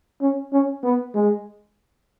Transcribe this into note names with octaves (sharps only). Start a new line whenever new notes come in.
C#4
C#4
B3
G#3